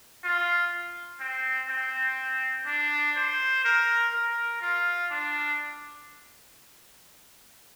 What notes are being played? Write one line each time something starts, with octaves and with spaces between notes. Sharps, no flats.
F4
C4
C4
D4
C5
A#4
A#4
F4
D4